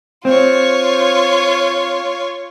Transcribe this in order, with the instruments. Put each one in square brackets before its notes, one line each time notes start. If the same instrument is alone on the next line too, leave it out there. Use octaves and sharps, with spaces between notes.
[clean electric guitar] C4 [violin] F4 C#5